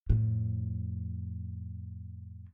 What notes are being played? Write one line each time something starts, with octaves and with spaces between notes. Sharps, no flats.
F2 A2